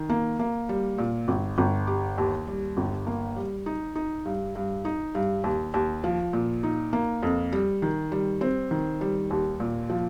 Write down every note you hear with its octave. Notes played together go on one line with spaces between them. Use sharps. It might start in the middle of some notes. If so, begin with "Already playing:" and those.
Already playing: D#3
A#3
A#3
G3
A#2
G1
G1
G4
D#2
G3
G1
A#3
G3
D#4
D#4
G2
G2
D#4
G2
D#2
D#2
F3
A#2
D#4
A#3
F2
G3
D#3
G3
C4
D#3
G3
D#2
A#2
F3